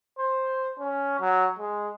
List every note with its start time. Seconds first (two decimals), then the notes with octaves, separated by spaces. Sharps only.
0.18 C5
0.79 C#4
1.20 F#3
1.59 G#3